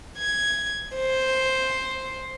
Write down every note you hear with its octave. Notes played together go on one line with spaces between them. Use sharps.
G#6
C5